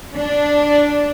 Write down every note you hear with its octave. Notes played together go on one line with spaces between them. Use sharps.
D4